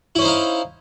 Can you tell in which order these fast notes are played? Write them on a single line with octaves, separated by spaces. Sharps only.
E4 C#4 C5 D#4 F5